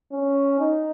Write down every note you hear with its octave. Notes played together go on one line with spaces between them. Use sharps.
C#4
D#4